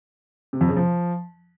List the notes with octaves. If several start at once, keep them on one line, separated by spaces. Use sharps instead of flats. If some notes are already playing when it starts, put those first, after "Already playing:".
C3
F2
C#3
F3